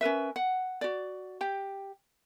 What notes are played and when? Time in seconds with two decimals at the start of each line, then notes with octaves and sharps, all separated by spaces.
0.01 C#4 A#4 B4 E5
0.36 F#5
0.81 F#4 D5
1.41 G4 G5